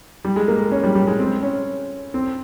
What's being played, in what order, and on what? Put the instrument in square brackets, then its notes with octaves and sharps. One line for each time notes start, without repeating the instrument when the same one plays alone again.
[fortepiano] G3
G#3
A#3
C#4
G3
G3
G#3
C4
C#4
C4